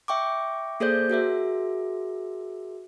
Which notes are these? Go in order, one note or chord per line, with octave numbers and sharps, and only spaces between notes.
E5 G5 C#6 D6
A#3 G#4 A4 C5 D5 G6
F#4 G#4 A#4 E5